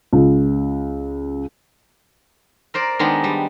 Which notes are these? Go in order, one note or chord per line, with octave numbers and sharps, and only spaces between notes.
C#2
A#4 C5 D5
D#3 G#3 B3 D4
G3